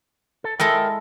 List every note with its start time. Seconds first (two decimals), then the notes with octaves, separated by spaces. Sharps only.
0.44 A4
0.60 G#3 E4 A4 A#4 G5